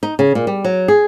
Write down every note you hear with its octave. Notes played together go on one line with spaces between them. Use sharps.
D#4
C#3
A#2
G3
F#3
G#4